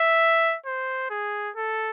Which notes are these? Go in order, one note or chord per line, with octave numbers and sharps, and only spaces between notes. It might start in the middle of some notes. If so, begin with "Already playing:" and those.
Already playing: E5
C5
G#4
A4